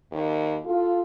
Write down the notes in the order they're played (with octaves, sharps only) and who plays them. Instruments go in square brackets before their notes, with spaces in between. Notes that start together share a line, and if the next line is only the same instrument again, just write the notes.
[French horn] D#2
[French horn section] F4 [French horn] A4